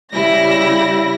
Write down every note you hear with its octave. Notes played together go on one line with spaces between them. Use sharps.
C#3 G3 E4 A#6